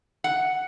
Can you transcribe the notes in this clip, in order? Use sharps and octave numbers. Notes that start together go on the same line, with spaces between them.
F#5